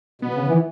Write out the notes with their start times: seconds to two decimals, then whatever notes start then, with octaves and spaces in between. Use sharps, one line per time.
0.22 B2 B3
0.34 C#3
0.48 E3